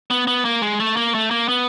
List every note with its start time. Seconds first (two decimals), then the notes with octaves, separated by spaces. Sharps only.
0.11 B3
0.27 B3
0.45 A#3
0.62 G#3
0.80 A3
0.97 A#3
1.14 A3
1.31 A#3
1.48 B3